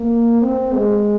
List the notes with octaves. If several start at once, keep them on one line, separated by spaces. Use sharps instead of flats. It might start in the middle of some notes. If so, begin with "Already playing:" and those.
Already playing: A#3
C4
G#3